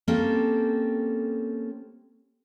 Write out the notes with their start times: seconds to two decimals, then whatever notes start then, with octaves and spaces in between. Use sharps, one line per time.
0.08 A#3 C4 C#4 G4 A4